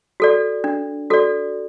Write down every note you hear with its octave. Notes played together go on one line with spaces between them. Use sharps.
F#4 A4 D5
D4
F#4 A4 D5